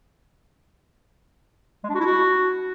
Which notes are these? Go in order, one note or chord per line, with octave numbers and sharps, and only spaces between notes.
G#3
D4
F#4
E4
F#4